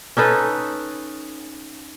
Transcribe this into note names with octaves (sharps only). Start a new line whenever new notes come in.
C#4 D#4 A4 B4